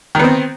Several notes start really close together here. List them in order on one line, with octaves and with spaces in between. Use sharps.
D#3 B3 C4